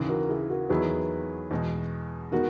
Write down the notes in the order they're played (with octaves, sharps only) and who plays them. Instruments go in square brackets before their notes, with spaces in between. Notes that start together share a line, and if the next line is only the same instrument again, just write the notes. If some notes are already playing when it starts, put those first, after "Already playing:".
Already playing: [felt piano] D#2 C#3 E3
[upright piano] F#4 A#4
E4 G#4
F#4 A#4
[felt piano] E2 D#3 F#3 B3 E4 [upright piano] G#4 B4
[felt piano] E2 B2 G#3
[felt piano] D#3 G#3 B3 D#4 [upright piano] F#4 A#4